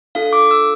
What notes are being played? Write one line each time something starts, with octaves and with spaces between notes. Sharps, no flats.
D4 F4 A4 F5
D6
E6